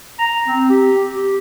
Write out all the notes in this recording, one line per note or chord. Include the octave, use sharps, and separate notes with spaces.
A#5
C4
G4
G4